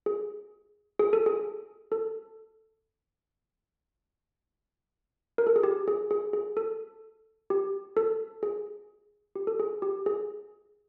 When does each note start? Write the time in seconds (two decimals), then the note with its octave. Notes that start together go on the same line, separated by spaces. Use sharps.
0.06 G#4
0.99 G#4
1.13 A4
1.26 G#4
1.92 A4
5.38 A#4
5.47 A4
5.56 G#4
5.63 G4
5.88 G#4
6.11 G#4
6.33 G#4
6.57 A4
7.50 G4
7.97 A4
8.43 G#4
9.36 G4
9.47 A4
9.60 G#4
9.82 G4
10.06 G#4